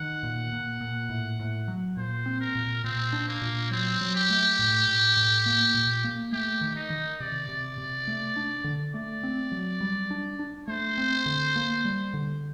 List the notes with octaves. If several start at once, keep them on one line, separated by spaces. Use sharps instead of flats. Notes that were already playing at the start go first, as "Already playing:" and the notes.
Already playing: D#3 F#5
A#2
A#2
A#2
A2
A2
F#3
A#2 C5
C4
A#4
A#2
A#2 C4
D4
A#3
A#2
F#3 C4
F#3
G4
A3
A2
A2
A2
A#3
A#2
A#3
A3 G4
D#3
D#4
D#3
C3 D5
C3
C3
A3
D4
D3
A3 D5
C4
F#3
G3
D4
D4
A3 C5
C4
D3
A#3
G3
D3